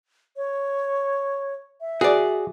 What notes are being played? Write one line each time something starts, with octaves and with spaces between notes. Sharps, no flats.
C#5
E5
F#4 G#4 D5